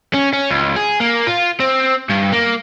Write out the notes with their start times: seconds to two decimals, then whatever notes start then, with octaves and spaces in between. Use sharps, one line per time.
0.14 C#4
0.33 C#4
0.50 C#2
0.76 G#4
1.00 A#3
1.27 F4
1.60 C4
2.09 G2
2.32 A#3